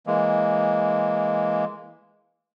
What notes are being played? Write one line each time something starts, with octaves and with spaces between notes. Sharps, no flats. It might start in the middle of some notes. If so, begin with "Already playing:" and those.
E3 G#3 A#3